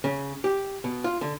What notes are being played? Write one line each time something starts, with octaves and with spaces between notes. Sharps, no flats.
C#3
G4
B2
F4
D3